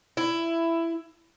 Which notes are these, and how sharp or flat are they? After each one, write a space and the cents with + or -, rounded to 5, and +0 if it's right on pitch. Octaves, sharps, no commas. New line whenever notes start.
E4 +15